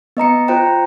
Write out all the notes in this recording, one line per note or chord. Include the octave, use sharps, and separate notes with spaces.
B3 D#5 A#5 C#7
F4 C5 G5 A#5